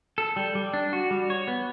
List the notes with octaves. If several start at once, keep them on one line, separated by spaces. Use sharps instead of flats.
A4
G3
G3
D4
F#4
G3
C#5
B3